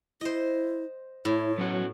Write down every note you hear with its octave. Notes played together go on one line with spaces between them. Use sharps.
E4 C5 D#5
A2 E4 C#5
F#3 B3 C#4 F#4